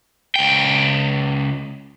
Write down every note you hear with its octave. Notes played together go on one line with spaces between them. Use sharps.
C#2 G5